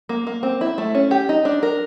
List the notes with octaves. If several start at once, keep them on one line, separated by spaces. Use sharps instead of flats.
A#3
A#3
C4
E4
A3
C#4
G4
D#4
D4
A#4